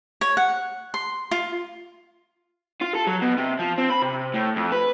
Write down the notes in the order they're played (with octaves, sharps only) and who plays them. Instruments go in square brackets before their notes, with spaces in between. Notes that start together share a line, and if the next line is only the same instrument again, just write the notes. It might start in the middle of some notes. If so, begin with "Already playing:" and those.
[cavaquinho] C#5
F#5
C6
F4
[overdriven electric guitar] F4
A4
F#3
B2
C3
F3
C4
B5
C3
A2
F2
B4